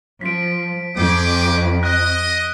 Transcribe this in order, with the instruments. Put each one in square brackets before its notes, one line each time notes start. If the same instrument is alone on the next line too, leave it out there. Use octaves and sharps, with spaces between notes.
[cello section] F3 [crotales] B6 D7
[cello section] F2 [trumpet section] G#4 G5 D6
[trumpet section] D#5 [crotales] F#6